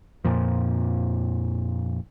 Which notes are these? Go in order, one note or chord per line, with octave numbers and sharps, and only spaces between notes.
F2 A#2 F3